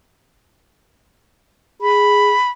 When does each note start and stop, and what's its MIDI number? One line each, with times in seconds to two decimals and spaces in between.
1.81 2.32 68
1.81 2.50 83